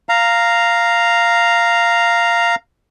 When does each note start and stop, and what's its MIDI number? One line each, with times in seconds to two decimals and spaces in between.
0.09 2.55 77
0.09 2.55 82